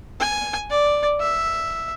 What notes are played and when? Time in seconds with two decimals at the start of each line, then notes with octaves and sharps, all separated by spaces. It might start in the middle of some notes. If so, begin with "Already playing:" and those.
0.20 G#5
0.70 D5
1.20 E5